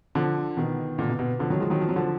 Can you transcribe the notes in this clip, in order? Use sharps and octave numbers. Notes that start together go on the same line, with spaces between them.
D3 F3
B2 D#3
A#2 D3
B2
B2
D3 F3
D#3 F#3
F3 G#3
D#3 F#3
F3
F#3
D3 F3